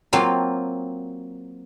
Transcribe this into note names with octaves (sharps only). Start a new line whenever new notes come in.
F#3 A#3 C4 F4 A5 C6